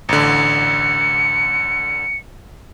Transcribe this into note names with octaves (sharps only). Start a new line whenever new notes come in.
A1 D3 C#7